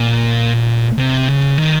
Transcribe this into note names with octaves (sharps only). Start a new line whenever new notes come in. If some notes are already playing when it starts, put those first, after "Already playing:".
Already playing: A#2
C3
C#3
D#3